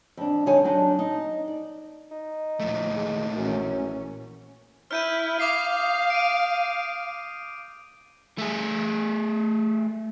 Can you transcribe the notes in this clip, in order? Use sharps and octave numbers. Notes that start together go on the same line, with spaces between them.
F2 D4
G2 D3 D#4 C#5 G#5
F#3 D4 D#4
D#4
D5
D#4
D2 A#2 F3 A3
F1 D#3 G#3
A#1 F#2 E3 C#4
E4 F6 G6 D#7
F5 D6 D#6 C7
D7 D#7
A3 G#4